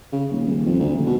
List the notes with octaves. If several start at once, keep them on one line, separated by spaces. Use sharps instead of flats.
C#3
D#1
D#1
F2
D2
D#1
B2